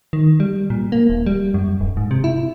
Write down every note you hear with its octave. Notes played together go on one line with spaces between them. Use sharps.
D#3
G3
A#2
A#3
D#1
G3
F#2
D1
G#2
C3
E4